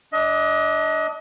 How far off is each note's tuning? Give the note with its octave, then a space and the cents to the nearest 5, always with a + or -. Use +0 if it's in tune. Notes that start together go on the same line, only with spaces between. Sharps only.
D4 +0 D#5 +30